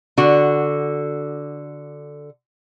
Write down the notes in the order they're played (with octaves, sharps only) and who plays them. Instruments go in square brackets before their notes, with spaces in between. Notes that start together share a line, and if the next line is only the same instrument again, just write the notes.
[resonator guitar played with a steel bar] D3 F#4